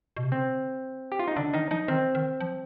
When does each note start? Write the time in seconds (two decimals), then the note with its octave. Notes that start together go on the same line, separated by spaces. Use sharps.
0.17 B2
0.24 C3
0.32 D3 C4
1.12 G4
1.19 F4
1.28 D#4
1.36 D3 D4
1.54 D#3 D#4
1.71 F3 D#4
1.88 D#3 C4
2.15 D#3
2.40 F3